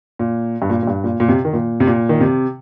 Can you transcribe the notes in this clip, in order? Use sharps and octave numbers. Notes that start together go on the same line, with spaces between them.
A#2
G2
A#2
A#2
G2
A#2
A#2
C3
D#3
A#2
C3
A#2
D#3
C3